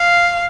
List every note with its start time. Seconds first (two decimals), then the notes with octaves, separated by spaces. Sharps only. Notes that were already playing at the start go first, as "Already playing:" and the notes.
Already playing: F5